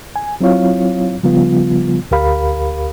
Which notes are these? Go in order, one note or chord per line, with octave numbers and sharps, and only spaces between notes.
G#5
F#3 C4 E4 F4 C#5 F5
C#3 F3 G3 B3 F4
D2 G4 A#4 F5 B5